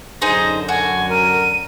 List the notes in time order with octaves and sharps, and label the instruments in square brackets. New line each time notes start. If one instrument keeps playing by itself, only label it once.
[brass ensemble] F#2 D3 [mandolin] D#4 G#4 C5 [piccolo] A#6
[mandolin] F#4 [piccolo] G#5
[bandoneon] A#4 [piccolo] D#7